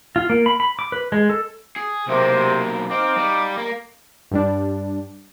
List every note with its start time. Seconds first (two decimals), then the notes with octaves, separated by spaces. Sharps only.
0.16 F4
0.30 A#3
0.46 B5
0.60 B5
0.79 D6
0.92 B4
1.12 G#3
1.30 A4
1.76 G#4
2.08 B1 C3 A#3
2.91 C4 D#4 F5 D6
3.18 G3
3.58 A#3
4.31 G2 G3 D4